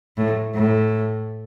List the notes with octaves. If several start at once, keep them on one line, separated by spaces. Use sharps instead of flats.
A2
A2